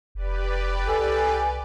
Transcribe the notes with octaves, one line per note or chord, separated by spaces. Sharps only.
F1 G4 B4 D5
C2 A4 G#5